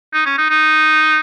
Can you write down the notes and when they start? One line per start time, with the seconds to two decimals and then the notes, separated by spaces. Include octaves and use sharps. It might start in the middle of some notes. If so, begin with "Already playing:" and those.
0.14 D#4
0.26 C#4
0.38 D#4
0.50 D#4